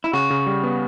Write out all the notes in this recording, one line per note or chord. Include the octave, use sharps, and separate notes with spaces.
E4
C#3 F#4
C#3
G3
B3